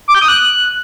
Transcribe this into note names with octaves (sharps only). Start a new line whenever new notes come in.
D6
G6
D#6
F#6